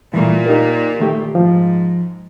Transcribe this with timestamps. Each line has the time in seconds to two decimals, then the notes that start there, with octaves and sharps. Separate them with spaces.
0.14 A#2 E3 G3 A3
0.46 D#4 G4 A#4
1.00 D#3 A3 G4
1.35 G#2 F3